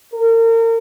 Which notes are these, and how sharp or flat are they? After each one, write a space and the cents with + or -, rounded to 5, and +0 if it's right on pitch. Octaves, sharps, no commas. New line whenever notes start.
A#4 -35